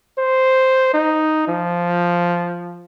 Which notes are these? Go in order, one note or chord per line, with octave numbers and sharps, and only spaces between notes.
C5
D#4
F3